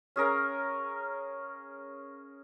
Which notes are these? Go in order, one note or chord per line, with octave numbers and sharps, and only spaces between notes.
C#4 G#4 A#4 F5